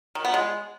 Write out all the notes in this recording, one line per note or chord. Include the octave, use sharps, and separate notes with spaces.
D#3
B3
G#3